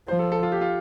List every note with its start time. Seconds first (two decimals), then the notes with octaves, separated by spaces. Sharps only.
0.08 F3 C5
0.19 A4
0.32 A4
0.43 F4
0.52 G4
0.61 F4